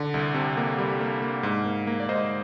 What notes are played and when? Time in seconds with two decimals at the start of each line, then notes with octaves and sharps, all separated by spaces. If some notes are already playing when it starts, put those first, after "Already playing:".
Already playing: D3
0.14 C2
0.34 C3
0.57 A#3
0.78 G3
1.01 A#3
1.22 A#3
1.43 G#2
1.65 A#3
1.87 A#3
2.00 D5
2.08 G#2 C5 D#5